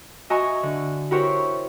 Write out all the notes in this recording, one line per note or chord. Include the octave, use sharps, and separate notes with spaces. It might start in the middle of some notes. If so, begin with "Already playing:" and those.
F#4 D#5 E5 G#5 A#5 C#6
D3
E4 F#4 G4 A#4 C5 C#5